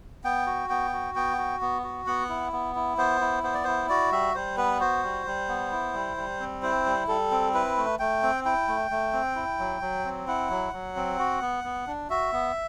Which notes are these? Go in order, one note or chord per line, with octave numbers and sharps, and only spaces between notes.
B3 G5
F#4
B3 G5
F#4
B3 G5
F#4
B3
F#4
B3 F#5
E4
B3
E4
B3 C5
E4
B3 C5
D5
E4 C5
F#4 D5
G3 E5
G3 C5
B3 B4
F#4 C5
G3
G3
B3
E4
G3
G3
C4
E4 C5
G3
G3 A4
C4
E4 B4
A3
A3 G5
C4
E4 G5
A3
A3
C4
E4
F#3
F#3
C4
E4 F#5
F#3
F#3
C4
F#4
B3
B3
D4
F#4 E5
B3